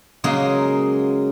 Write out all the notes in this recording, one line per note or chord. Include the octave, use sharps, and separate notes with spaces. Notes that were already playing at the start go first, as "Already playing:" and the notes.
C#3 F#3 G#3 A#3 G#4